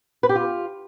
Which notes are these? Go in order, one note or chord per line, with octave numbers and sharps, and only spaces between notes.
B4
G4
F4